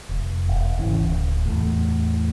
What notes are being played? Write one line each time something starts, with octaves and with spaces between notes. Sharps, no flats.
F1
E1
G#1 C#3 E3
D1
E2 A2